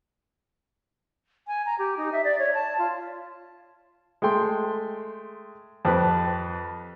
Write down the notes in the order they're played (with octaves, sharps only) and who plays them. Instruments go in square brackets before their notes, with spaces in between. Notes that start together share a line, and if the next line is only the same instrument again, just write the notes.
[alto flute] G#5
A#5
G4
D#4
E5
D5
C#5
A5
F4
[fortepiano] G#3 A3 G5 C6
F2 G4 B4